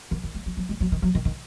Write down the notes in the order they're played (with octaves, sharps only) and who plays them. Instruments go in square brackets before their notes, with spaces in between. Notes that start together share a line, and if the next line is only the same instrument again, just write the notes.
[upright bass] D#3
D#3
G#3
F#3
F#3
G#3
F#3
D#3
F#3
D#3
D#3